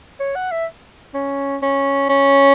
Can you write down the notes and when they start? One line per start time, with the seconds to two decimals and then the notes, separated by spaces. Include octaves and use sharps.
0.20 C#5
0.35 F#5
0.51 E5
1.14 C#4
1.62 C#4
2.09 C#4